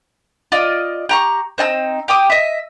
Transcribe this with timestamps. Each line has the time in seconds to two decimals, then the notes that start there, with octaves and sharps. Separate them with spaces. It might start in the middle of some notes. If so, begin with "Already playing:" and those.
0.52 F4 D5 D#5
1.09 G4 A#5 C#6
1.58 C4 D#4 A5 E6
2.08 G4 G5 D6 D#6
2.30 D#5 E5